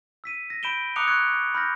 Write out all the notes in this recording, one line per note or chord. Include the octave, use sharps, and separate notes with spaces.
E6 B6 D#7
A#6
B5 G6 D7 E7 G7
A#5 D6 D#6 F#6 C#7 F7
C#6 D6 E6 F#6 G#6 C#7
B5 F6 G6 A#6